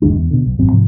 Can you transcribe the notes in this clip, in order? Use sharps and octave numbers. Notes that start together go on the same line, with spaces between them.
G1 D#2 G#3 D4
E2
B2 D3
B1
G#1 F#2 C4
G#2 C3 F3